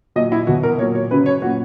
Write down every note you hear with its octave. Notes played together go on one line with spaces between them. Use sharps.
A#2 F#3 D#5
E4
E2 B2 F#3 F#4
A#4
A#2 F#3 C#5
C#5
F#2 C#3 F#3 B4
C#5
A#2 F#3 F#4